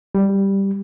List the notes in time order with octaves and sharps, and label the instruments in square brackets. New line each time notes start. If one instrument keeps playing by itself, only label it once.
[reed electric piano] G3